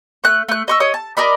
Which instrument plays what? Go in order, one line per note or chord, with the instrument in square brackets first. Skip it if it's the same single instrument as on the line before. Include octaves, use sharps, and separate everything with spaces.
[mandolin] A3 F#6
A3 F#6
D#5 C#6 E6
C#5 D#5 D#6
A5
A#4 D5 D#5 B5